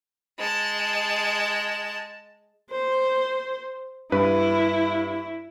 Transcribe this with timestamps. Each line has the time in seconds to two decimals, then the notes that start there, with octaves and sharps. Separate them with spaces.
0.38 G#3 A5
2.71 C5
4.12 G2 E4 B4